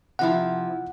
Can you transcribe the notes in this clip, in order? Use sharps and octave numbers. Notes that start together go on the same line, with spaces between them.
C3 F3 E4 F#5